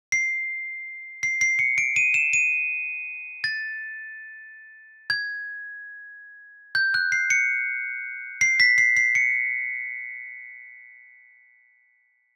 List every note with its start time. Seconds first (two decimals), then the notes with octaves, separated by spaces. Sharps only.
0.12 C7
1.23 C7
1.41 C7
1.59 C#7
1.78 D7
1.96 D#7
2.14 E7
2.33 D#7
3.44 A6
5.10 G#6
6.75 G6
6.94 F#6
7.12 C7
7.30 C#7
8.41 C7
8.60 B6
8.78 C7
8.97 C7
9.15 C#7